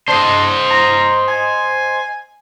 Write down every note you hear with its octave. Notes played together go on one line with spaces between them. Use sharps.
D4 C5 D#5
A#5
G#5